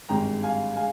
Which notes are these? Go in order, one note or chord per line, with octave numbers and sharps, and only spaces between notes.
G#1 G2 D#3 G#3 G5 A#5
F5 G#5
G#3 F5 G#5